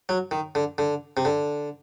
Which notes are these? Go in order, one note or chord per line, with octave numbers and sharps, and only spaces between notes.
F#3
D#3
D3
D3
C3
D3